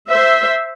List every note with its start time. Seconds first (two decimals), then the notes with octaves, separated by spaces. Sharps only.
0.09 C5 E5